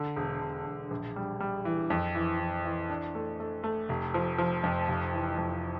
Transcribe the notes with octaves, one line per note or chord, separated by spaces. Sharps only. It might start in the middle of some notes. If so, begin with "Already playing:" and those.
Already playing: D3
E1
E1
E1
A#1
G3
G3
E3
F2
E3
E3
E3
D4
A3
A3
A3
F1
F3
F3
F2
F1
E3
F2